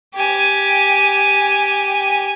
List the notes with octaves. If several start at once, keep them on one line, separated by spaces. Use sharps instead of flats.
G4 G#5